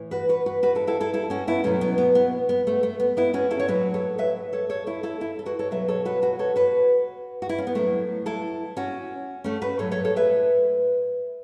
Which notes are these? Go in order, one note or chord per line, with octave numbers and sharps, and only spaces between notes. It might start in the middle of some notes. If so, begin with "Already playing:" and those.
Already playing: A2 E3
F#4 B4
F#4 B4
F#4 B4
F#4 B4
E4 A4
E4 A4
E4 A4
E4 A4
C#4 F#4
B3 E4
B2 F#3 A3 C#4
B3
B3
B3
B3
A3
A3
B3
B3 E4
C#4 F#4
E4 A4
C#5
A2 F#3 F#4 B4
A4 C#5
B4 E5
A4 C#5
A4 C#5
E4 A4
E4 A4
E4 A4
A4
F#4 B4
A4 C#5
B2 F#3 B4 E5
A4 C#5
F#4 B4
F#4 B4
A4 C#5
F#4 B4
F#4
E4
C#4
B3
A2 F#3 A3
E4 A4
C#4 F#4
A3 C#4
F#4 B4
A2 F#3 A4 C#5
A4 C#5
A4 C#5
B4 E5